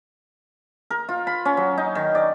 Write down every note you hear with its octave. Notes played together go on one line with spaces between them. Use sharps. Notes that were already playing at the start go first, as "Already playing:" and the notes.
A#4
F4
B5
C#4
F#3
D#4
D#3
D5